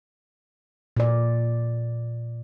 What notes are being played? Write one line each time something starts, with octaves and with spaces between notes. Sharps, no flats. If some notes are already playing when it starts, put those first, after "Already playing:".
A#2 D5